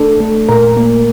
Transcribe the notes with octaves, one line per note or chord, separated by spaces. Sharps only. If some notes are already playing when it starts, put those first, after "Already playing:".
Already playing: A3 D4 A4
A3
A#2 A#4
A#3